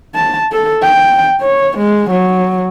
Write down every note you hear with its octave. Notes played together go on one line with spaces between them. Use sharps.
A5
A4
G5
C#5
G#3
F#3